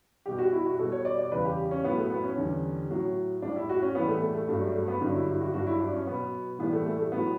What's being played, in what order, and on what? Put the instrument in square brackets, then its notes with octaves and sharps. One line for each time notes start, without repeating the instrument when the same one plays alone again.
[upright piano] B2 G3 G4
F#4
E4
F#4
B2 G3 A4
C#5
D5
D5
E2 C#3 G3 B4
G4
C#4
A2 F#3 B3
A3
B3
C#4
E2 D3 G3
A2 F#3
A2 G3 D4
E4
F#4
C#4
A2 E3 G3 B3
A3
A3
A3
G2 F#3 A3
G3
A3
B3
G2 D3 F#3
E4
E4
F#4
G2 F#3 F#4
E4
D4
C#4
B2 F#3 B3
A2 E3 G3 B3
A3
A3
A3
A2 F#3 B3